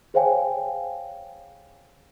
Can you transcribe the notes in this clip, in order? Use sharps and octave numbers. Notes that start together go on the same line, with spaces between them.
G#4 C5 C#5 F5 G5 G#5